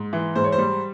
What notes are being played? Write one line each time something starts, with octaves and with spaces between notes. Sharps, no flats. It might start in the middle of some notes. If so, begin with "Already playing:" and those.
Already playing: G#2
E3
G#2 C5
C#5
C5
G3